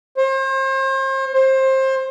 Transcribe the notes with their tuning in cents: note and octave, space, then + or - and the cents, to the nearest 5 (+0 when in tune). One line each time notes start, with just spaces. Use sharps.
C5 +40
C5 +25